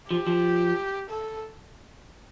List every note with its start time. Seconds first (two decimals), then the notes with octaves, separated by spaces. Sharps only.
0.10 F3 G4
0.27 F3
1.10 A4